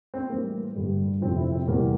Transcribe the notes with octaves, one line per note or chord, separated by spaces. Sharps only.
C4
A2 E3 G3 A#3
G2 D3 G3
F2 C3 F3 C4
E4
C4
E2 C3 G3 A#3